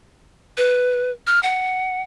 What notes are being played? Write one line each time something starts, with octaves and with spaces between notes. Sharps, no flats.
B4
F6
F#5